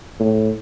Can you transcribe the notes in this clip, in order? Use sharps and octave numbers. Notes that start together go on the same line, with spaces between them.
A2